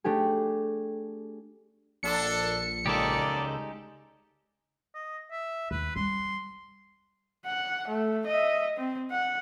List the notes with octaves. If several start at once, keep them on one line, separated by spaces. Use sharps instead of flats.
A3 D4 G4 G#4
A#1 D4 A4 C#7
C#2 G#3 A#3 D#4 G4 A4 D5
D#5
E5
D#2 B4
G3 C6
F#5
A3
D#5 E5
C4
F#5